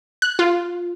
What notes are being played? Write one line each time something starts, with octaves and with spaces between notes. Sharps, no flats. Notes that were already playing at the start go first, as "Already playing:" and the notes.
F#6
F4